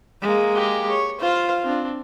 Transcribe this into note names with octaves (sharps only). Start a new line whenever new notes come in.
G#3 A#3
G4 G#4
C#5
F4 C5 F5
C4 D4